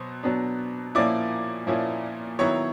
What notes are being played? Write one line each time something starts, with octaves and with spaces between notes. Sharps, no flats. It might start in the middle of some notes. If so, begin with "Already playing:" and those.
Already playing: B2 F#3 B3 C5
B2 F#3 B3 D4
A#2 F3 A#3 C#4 E4 D5 D6
A#2 F3 A#3 C#4 E4
D#3 F#3 B3 E4 C#5 C#6